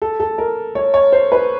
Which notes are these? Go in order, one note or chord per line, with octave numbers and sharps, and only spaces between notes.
A4
A4
A#4
C#5
C#5
C5
B4